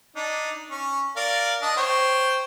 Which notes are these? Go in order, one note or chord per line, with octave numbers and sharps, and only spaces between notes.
D4 D#4
C#4
A#4 D5 F5
D4 D#5
C5 C#5 G5